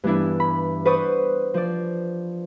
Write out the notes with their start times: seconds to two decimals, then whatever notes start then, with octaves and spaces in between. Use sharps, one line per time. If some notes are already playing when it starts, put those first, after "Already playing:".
0.04 G2 E3 B3 D4 E4
0.40 B5
0.85 B4 C5 D5 F#5 C#6 D#6
1.54 F3 D5